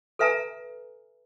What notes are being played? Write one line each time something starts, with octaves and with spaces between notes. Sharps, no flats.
A4 B4 E5 G#5 A#5